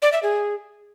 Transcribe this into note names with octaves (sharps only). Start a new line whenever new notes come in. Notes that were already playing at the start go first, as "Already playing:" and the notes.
D5
E5
G#4